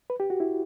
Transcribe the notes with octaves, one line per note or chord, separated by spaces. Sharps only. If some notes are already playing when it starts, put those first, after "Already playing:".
B4
G4
F#4
E4